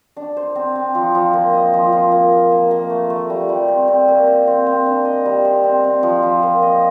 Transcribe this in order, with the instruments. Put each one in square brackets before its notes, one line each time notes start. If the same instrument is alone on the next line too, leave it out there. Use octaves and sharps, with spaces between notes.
[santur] D4
C5
C4
C4
F3
F3
A#3
D#5
F3
F4
A#3
A#3
A#3
A#3
A3
A3
G3
G3
C4
C4
A#3
C5
C4
C4
D4
D#5
G3
C5
C4
C4
F3
F3
A#3
D#5